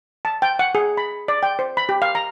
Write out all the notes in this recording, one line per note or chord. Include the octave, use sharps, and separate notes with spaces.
A5
G5
F#5
G#4
B5
D5
G5
C5
B5
G4
F5
A#5